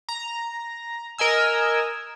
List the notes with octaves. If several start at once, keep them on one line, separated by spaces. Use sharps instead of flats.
A#5
A#4 D#5 G#5 E6